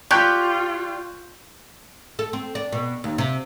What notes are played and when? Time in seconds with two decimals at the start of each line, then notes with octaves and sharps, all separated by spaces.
0.11 F4 G4 D5 C#6 F#6 G6
2.19 A4
2.33 C4
2.55 D4
2.72 B2
3.04 D#2
3.18 C3